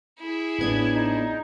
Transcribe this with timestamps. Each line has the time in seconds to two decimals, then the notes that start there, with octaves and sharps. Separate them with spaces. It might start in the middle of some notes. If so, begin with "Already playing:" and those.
0.19 E4 G#4
0.59 A1 A2 B3 D4 G#6
0.94 D#4